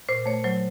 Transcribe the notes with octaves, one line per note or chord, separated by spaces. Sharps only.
A#2 C5
A3 C#5
F#3 C5